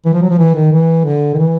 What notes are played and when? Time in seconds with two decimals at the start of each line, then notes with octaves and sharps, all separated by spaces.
0.06 E3
0.14 F3
0.22 F#3
0.30 F3
0.38 E3
0.55 D#3
0.72 E3
1.05 D3
1.34 D#3
1.39 E3